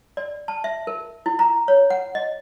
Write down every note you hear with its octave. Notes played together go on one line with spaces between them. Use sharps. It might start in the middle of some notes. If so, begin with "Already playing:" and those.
D5
A5
E5
A#4
E4
A#5
C#5
F#5
D#5